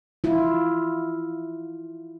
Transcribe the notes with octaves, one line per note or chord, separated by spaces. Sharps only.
E4 F4